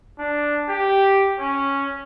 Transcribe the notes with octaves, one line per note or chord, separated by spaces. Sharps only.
D4
G4
C#4